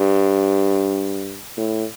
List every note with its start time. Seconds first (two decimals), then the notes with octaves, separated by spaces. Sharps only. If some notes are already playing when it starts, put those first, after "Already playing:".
Already playing: G2
1.57 A2